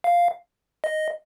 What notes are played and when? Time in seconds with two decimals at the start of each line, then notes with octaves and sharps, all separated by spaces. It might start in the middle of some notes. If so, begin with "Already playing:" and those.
0.04 F5
0.84 D#5